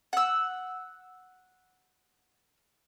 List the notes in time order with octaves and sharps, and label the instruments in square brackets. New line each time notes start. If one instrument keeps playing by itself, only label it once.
[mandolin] F#5 E6